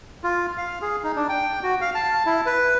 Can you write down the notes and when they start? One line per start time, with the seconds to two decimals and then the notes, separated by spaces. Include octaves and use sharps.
0.24 F4
0.58 F5
0.82 G#4
1.04 D#4
1.16 D4
1.29 G5
1.63 F#4
1.81 F5
1.95 A5
2.26 E4
2.46 B4